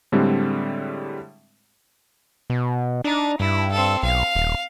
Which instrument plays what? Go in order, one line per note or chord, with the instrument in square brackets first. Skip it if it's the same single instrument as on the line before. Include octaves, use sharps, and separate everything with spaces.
[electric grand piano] A2 D3 G3 G#3 C4
[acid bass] B2
[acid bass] D4 [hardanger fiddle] D#4
[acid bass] G2 [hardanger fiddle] E4
[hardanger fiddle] C4 A4
[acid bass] B1 [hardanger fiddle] F5
[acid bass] D#1